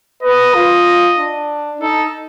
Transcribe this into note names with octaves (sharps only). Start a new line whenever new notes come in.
B4 D#5
F4
D4
D#4 A4